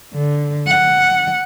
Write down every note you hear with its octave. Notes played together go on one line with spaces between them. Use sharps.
D3
F#5